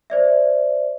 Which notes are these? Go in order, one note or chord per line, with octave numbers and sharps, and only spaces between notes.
C5 D5 E5